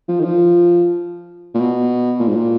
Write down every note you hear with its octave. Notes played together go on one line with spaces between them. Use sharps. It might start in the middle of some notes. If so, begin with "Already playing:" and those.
F3
D#3
F3
A#2
B2
A#2
G#2
A#2